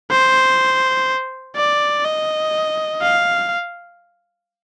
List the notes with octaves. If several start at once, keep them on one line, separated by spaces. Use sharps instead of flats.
C5
D5
D#5
F5